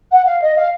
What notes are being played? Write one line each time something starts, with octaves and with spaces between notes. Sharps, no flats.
F#5
F5
D#5
F5